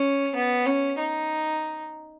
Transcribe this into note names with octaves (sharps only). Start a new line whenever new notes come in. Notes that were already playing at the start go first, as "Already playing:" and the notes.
Already playing: C#4
B3
C#4
D#4